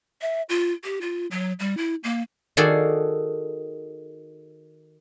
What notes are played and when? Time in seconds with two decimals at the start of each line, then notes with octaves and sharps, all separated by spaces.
0.22 E5
0.49 F4
0.84 G4
1.01 F4
1.31 F#3
1.60 G3
1.78 E4
2.04 A#3
2.57 D#3 F#4 G#4 A4 D5 F5